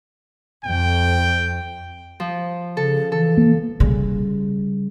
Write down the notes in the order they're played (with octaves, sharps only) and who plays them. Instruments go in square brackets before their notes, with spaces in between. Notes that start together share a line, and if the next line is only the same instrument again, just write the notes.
[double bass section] F2 [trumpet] G5
[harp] F3
[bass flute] C#3 [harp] A4
[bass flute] E3 [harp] A4
[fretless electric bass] A#3
[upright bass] C#3 G3